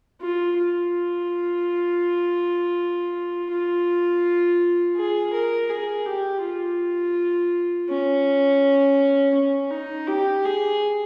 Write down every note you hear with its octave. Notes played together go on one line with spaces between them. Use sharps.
F4
F4
F4
G#4
A#4
G#4
G4
F4
C#4
C#4
D#4
G4
G#4